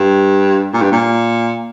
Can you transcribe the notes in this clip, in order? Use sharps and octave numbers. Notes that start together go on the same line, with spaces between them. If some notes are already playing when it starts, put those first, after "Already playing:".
Already playing: G2
A#2
G2
A#2